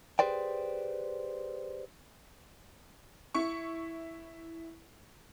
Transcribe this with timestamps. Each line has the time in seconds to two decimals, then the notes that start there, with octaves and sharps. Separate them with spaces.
0.19 G4 G#4 B4 C5 D5 G5
3.34 E4 C#6